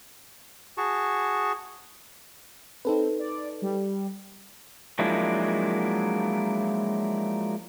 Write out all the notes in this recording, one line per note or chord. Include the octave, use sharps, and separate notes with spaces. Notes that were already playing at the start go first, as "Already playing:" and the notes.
F#4 G#4 A5 C#6
C4 D#4 A4 B4
D5
G3
F3 F#3 G#3 A#3 D4 E4